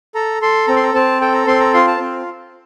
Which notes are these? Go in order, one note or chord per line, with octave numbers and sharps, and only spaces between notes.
A4 A#5
A4 C6
C4 A#5
C6
A#5
C4 A5
A4 G5
A#5
C4 C6
A#5
F4 C6
A5
C4